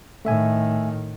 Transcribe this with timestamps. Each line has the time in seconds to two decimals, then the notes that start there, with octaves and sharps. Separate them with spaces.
0.25 A2 D#3 A3 E5 G#5